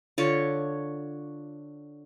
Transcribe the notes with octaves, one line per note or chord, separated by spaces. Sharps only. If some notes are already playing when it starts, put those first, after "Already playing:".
D3 F4 C#5